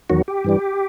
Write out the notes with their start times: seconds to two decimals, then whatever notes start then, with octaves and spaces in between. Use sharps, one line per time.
0.10 E2 D#3 F#3 F#4
0.28 G4
0.44 G2 E3 G3